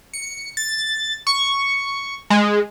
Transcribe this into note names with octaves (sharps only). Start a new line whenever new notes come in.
C#7
A6
C#6
G#3